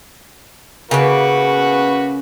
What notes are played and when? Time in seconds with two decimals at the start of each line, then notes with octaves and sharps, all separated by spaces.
0.91 C#3 A#3 F#4 B4